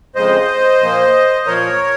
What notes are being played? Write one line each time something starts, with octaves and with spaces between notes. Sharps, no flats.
F2 C#3 G#3 C5 D#5
A#2 F3 A#3
A#2 F3 A#3 A#4 C#5